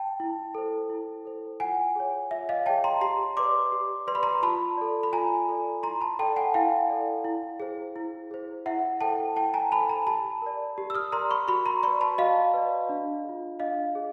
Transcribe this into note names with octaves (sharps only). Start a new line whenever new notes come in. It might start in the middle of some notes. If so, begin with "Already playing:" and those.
Already playing: G5 A5
E4
A4 C5
E4
A4 C5
F4 F#5 G#5
G#4 C#5
F4 E5
D#5 F5
G#4 C#5 G5 A5
A#5 C6
G4 A#5 C6
B4 D5 C6 D6
G4
B4 D5 C6
B5
A#5 C6
F4 A5 B5
A4 D5
B5
F4 G#5 A#5
A4 D5
E4 A#5 C6
A5 B5
A4 D5 G5 A5
F#5 G#5
E4 F5 G5
A4 D5
E4
G#4 C5
E4
G#4 C5
E4 E5 F#5
A4 C5 G5 A5
E4 G5 A5
G#5 A#5
A4 C5 A5 B5
G#5 A#5
G4 A5 B5
A#4 D5
G4
E6
D#6 F6
A#4 D5 A#5 C6
B5 C#6
F#4 B5 C#6
A#5 C6
B4 D5 B5 C#6
A5 B5
F#4 D#5 F5
B4 D5
D4
F4 G#4
D4 D#5 F5
G#4